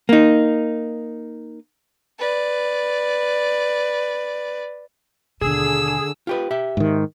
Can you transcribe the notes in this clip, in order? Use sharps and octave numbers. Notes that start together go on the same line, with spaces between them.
A#3 D#4
B4 D5
D#2 B2 D3 G#4 E6
F4 G4 B4
G4 E5
G#2 D#3